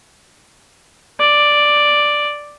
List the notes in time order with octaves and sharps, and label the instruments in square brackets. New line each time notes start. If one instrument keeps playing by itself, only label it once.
[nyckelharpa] D5